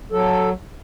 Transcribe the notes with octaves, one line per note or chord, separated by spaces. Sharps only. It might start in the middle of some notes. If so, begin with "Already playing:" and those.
F#3 A4